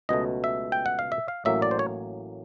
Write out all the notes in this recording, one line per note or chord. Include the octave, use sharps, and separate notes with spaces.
C#2 B2 F#3 A3 D#5
E5
G5
F#5
F5
E5
F5
A1 A2 F#3 A#3 E5
D5
C5
C#5